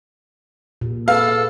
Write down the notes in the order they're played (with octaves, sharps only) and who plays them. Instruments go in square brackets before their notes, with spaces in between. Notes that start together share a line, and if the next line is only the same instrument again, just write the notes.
[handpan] A#2
[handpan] G#4 B4 [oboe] A4 [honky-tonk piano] F5